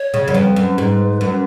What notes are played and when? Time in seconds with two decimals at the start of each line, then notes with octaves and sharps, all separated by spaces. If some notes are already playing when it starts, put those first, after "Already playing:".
Already playing: C#5
0.14 C#3
0.28 F#2
0.34 F2 B4
0.56 F#2
0.78 G#2
1.21 F#2